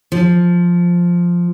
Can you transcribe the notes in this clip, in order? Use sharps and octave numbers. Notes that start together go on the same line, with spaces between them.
F3